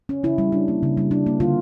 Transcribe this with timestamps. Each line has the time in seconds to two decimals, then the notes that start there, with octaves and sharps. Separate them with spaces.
0.09 C#4
0.23 C#3 E4
0.38 G3
0.52 D4
0.68 A#3
0.83 C#3
0.97 G3
1.11 D4
1.26 A#3
1.40 D3 F4